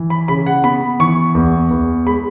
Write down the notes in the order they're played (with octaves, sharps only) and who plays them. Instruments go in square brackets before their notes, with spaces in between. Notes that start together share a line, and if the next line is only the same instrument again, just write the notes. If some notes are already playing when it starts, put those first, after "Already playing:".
Already playing: [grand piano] E3
B5
C#3 B5
F#5
B3 B5
E3 C#6
E2
E2
G#3 B5